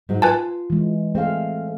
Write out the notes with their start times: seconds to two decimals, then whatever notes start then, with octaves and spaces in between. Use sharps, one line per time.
0.09 G#2 F#3 G#3
0.22 F4 B4 G#5 A5
0.70 E3 G#3
1.15 A3 C4 G#4 A4 F5